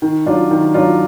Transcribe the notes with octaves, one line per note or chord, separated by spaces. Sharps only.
D#3
F#3 D4 F4
D#3
F#3 D4 F4